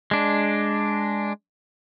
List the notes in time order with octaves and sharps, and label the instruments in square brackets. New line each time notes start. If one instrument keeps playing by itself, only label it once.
[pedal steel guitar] G#3 D4